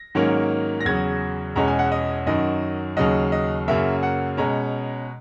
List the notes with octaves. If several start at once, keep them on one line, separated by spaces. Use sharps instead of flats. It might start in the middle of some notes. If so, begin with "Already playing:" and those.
Already playing: A#6
G#2 D#3 F#3 A#3 C#4
A#6
E2 C#3 F#3 G#6
E2 B2 G#3 C#4 A#5
G#5
F#5
D#5
F#2 D#3 F#3 D#5
D#2 C#3 F#3 D#5
D#5
F#2 C#3 F#3 A#3 E5
F#5
B2 G#3 C#4 A#5